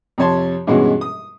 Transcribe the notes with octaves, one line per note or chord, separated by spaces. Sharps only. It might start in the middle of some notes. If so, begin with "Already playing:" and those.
F2 C3 C#5 A5 C6
G2 B2 E3 G#3 C#4 F#4
D#6